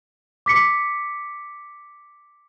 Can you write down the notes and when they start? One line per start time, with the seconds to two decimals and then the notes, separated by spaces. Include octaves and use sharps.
0.46 D6 B6 C#7